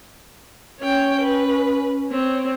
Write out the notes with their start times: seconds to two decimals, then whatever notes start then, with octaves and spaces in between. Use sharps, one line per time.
0.80 C#4 C#5 G5
1.21 B4
2.10 C4 C#5